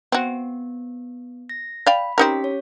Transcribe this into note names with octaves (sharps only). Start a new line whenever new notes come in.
B3 C4 F#4
A#6
D5 F5 G5 B5
C4 C#4 D#4 G4 A#4 B6
C#5